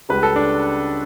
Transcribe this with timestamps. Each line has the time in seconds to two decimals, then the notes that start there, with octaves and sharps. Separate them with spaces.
0.09 C#2 C#3 G3 B4
0.23 A4
0.36 D4